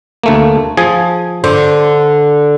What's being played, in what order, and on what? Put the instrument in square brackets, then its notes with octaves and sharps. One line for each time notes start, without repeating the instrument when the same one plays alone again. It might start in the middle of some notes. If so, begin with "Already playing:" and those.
[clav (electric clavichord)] D2 A3 A#3
F3 G#4 G#5
[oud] D3 [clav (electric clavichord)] C5